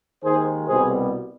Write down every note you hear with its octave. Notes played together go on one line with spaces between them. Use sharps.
D#2 D#3 G#3 G#4 C5
C2 B2 G3 G#4 C5